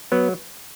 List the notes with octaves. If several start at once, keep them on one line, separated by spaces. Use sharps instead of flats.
F#3 B3